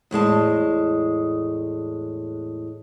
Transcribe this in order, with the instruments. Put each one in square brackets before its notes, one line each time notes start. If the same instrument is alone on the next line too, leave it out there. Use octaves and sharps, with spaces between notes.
[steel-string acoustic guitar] E2 A2 G#3 A5